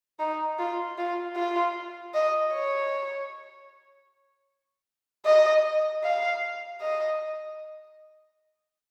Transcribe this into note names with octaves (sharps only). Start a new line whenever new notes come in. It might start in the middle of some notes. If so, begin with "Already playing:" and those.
D#4
F4
F4
F4
D#5
C#5
D#5
F5
D#5